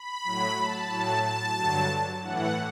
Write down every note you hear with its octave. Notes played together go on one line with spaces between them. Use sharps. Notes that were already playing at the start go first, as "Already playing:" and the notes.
Already playing: B5
A2 F#3
A5
A2 F#3
A5
G2 D3 F#3
A2 E3 F#5